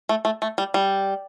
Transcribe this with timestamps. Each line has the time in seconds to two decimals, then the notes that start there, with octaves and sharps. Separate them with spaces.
0.09 A3
0.25 A3
0.42 A3
0.58 G3
0.74 G3